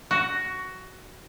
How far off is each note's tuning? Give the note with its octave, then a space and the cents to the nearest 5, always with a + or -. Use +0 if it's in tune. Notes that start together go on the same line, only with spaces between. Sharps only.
F#4 +15